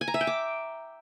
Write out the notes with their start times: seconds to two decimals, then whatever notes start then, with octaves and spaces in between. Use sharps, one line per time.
0.01 G#5
0.08 A#5
0.14 E5
0.21 G5
0.27 D6